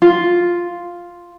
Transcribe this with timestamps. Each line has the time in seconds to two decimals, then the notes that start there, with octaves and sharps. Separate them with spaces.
0.02 F4